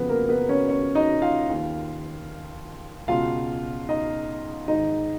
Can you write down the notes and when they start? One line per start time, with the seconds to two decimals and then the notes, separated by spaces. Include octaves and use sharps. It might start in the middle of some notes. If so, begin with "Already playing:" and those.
Already playing: F2 C#3 F3 B3 B4
0.09 A#3 A#4
0.29 B3 B4
0.49 C#4 C#5
0.69 C#4 C#5
0.95 D#4 D#5
1.22 F4 F5
1.49 D#2 D#3
3.08 C#2 B2 F4 F5
3.89 D#4 D#5
4.68 G#2 D#3 D#4 D#5